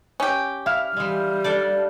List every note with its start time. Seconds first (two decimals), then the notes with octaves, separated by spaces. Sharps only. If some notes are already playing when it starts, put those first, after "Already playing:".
0.20 C#4 G4
0.66 E4 E5 F5 F6
0.97 E3 G3 G#3
1.44 D4 A4 D5